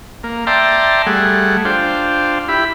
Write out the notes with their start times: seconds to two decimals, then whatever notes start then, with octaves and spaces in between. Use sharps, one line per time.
0.24 A#3
0.47 D5 E5 G5 A5 A#5 C6
1.06 G3 A3 G#4 F#5
1.65 D4 F4 C5 G5
2.48 E4 G4 B5